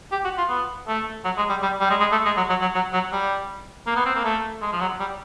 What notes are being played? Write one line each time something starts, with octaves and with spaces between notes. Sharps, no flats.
G4
F#4
F4
B3
A3
F#3
G#3
G3
G3
G3
G#3
G#3
A3
G#3
F#3
F#3
F#3
F#3
F#3
G3
A#3
B3
C4
A#3
A3
G#3
F3
F#3
G3